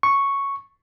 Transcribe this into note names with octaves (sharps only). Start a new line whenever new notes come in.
C#6